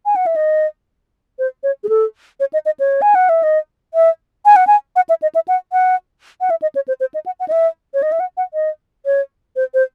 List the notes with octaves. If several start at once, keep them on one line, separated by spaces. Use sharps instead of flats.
G#5
F#5
E5
D#5
C5
C#5
G#4
A4
C#5
D#5
D#5
C#5
G#5
F#5
E5
D#5
E5
G#5
F#5
G#5
F#5
E5
D#5
E5
F#5
F#5
F#5
E5
D#5
C#5
C5
C5
D#5
F#5
F#5
D#5
E5
C#5
D#5
E5
F#5
F#5
D#5
C#5
C5
C5